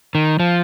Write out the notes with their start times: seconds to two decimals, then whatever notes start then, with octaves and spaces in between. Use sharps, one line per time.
0.15 D#3
0.40 F3